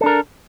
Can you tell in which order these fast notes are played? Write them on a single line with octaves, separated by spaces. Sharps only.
A4 D4 A#4